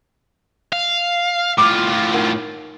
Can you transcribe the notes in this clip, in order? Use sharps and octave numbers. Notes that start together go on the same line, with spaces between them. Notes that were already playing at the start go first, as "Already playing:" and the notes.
F5
A2 F4 D6
D#4 A#4 F#5